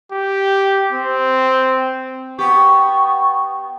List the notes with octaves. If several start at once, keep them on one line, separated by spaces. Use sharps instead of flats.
G4
C4
B3 G4 C#6